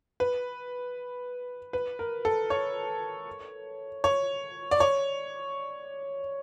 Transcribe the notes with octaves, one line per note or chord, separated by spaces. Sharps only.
B4
B4
A#4
A4
C#5
C#5
D5
C#5